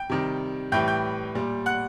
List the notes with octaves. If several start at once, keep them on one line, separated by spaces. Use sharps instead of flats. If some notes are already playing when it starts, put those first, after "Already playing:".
Already playing: G5 G6
C3 D#3 G3
A2 E3 G3 G5 G6
G5 G6
A#2 G3
F#5 F#6